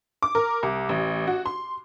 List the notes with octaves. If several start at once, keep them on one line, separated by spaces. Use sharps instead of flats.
D6
A#4
C2
A1
F#4
C6